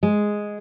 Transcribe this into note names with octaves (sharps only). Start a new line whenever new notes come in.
G#3